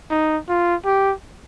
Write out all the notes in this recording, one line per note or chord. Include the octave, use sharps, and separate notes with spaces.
D#4
F4
G4